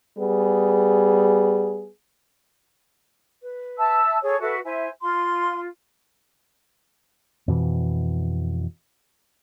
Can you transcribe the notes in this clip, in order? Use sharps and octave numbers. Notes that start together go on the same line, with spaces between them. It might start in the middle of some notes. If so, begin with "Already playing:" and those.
G3 B3 G#4
B4
E5 A5 E6
G#4 A4 C#5
F#4 A4 B4 E5
E4 C5 E5 G#5
F4 C6
F2 B2 E3